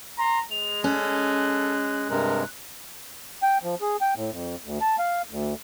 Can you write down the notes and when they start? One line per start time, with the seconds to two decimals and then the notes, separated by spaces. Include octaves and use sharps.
0.18 A#5 C6
0.51 G#3 F7
0.84 C#4 A4 F#6
2.10 G2 C3 G#3 A#4
3.43 G5
3.63 F3
3.81 G#4
4.01 G5
4.16 A2
4.32 F2
4.65 D2
4.81 A5
4.99 F5
5.31 D2